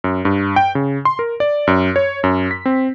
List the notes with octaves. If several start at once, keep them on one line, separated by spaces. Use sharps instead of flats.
F#2
G2
G5
C#3
C6
A#4
D5
F#2
C#5
F#2
B6
C4